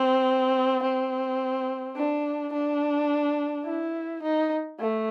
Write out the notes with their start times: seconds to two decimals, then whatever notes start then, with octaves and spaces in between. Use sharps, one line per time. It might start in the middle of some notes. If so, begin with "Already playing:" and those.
Already playing: C4
0.83 C4
1.96 D4
2.53 D4
3.65 E4
4.22 D#4
4.79 A3